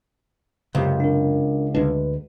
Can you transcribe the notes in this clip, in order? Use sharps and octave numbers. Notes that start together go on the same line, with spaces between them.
C#2 F#2 C3 G4
D4 A#4
D2 G#3 D4 B4